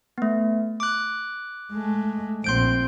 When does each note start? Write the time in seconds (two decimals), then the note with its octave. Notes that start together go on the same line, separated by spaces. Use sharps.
0.18 A3 B3
0.80 D6 F#6
1.72 G#3 A3
2.44 A#1 C4 C6 G6 D7